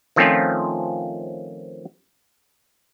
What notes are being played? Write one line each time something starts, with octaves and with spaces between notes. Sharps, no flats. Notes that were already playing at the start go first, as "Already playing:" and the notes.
D#3 F3 A3 C4 C#4 F4